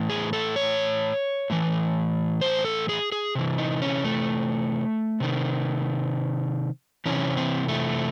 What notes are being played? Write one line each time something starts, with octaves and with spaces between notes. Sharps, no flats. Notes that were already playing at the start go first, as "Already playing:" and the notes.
Already playing: A2 E3
G#4
A4
C#5
A2 E3
C5
A4
G#4
G#4
C3 E3
D#4
C#4
A3
C3 D#3
C3 E3 C#4
C4
A3